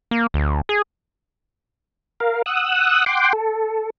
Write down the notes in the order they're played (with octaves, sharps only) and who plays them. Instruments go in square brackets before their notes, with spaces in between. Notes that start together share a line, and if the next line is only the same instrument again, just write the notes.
[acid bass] A#3
D2
G#4
[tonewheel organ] A#4 F5
F#5 D#6 E6 F#6
F#5 G5 C6 D6
A4